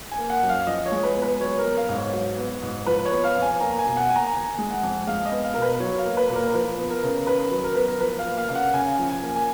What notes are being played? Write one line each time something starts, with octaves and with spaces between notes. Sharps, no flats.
G#5
A#3
F#5
F#2
F5
F3 D#5
C#5
G#3
B4
B3
B4
F#3 C#5
A#4
B3
F5
G#2
C#5
F#3
B3
G#2
F3 B4
C#5
B3
F5
F2
G#5
A#3 A#5
G#5
B2
F#5
A#3 G#5
A#5
D#3 G#5
G#3
F#5
F2
G#3 F5
D#5
B3
F5
B2 A#4
B4
F#3 C#5
F5
A#3
B4
A#2
A#4
F3 B4
B3
A#4
C#3
D#3 B4
F#3
A#4
B3 B4
A#4
F3 B4
F5
A#3
F5
C#3 F5
F#5
C#3 G#5
F3
G#5
A#3
G#5